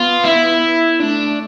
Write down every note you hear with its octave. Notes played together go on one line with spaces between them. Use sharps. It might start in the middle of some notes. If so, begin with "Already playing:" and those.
Already playing: B3 F4
E4
A3 D4